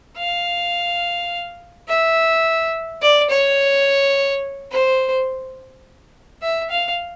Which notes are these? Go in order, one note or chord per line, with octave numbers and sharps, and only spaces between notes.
F5
E5
D5
C#5
C5
E5
F5